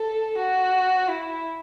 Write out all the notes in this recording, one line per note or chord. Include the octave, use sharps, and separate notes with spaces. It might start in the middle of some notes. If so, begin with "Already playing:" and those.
Already playing: A4
F#4
E4